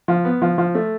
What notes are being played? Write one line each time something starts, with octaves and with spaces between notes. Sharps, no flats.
F3
B3
F3
F3
A3